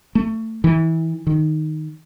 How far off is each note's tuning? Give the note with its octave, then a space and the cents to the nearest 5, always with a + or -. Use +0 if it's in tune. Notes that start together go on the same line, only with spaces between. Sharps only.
A3 +20
E3 -25
D#3 -5